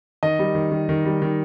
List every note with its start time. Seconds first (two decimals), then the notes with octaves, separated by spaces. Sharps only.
0.23 D#3 D#5
0.39 G3
0.55 D#3
0.72 D#3
0.89 D#3
1.05 G3
1.22 D#3